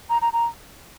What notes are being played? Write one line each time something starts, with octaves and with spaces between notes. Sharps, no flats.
A#5
A#5
A#5